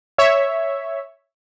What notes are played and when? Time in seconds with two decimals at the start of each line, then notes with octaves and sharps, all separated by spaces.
0.18 C#5 E5